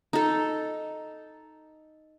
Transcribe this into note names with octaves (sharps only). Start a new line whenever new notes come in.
D#4 A4